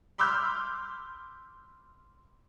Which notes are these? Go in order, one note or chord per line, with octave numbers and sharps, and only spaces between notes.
B5 C6 D6 E6 F6 G6